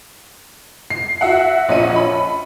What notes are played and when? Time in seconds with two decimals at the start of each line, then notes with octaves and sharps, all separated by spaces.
0.90 C7
1.21 F#4 E5 F#5
1.69 A#1 C#4 D#5 C#7 D#7
1.96 B5